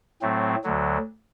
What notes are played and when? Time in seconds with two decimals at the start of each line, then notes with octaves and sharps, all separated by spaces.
0.22 A2 F#3 A3 C4
0.64 D2 D3 F#3